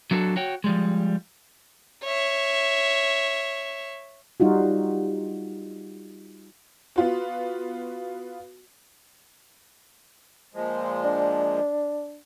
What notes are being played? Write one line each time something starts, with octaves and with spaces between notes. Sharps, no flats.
F#3 D4 F#4 A4
F#4 C#5 G5
F3 G3 G#3
C#5 E5
G3 D#4 F4 F#4
B3 F4 F#4
A#2 F3 G#3
D4